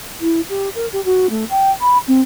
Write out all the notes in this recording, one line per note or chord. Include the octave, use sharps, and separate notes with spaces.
E4
G4
A#4
G4
F#4
A3
G5
B5
C4